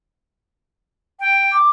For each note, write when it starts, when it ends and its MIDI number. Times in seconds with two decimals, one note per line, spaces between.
1.21 1.58 79
1.53 1.70 86